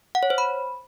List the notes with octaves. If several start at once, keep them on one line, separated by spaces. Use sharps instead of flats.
F#5
C#5
C5
B5